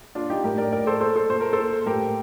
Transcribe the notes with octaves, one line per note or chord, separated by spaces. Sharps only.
A#2 D4 F4
D#4 G4
A2 G4 A#4
A#4 D5
A2 A#4 D5
A4 C5
A#2 A4 C5
A4 C5
A#2 C5
A#4
A#2 A4 C5
A2 G4 A#4